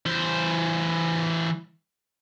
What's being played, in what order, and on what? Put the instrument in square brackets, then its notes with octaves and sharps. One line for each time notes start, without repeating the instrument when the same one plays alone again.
[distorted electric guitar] E3 C5